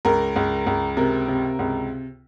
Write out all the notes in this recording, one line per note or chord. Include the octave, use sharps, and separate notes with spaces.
C#2 A#4
C#2
C#2
C3 A#4
C3
C#2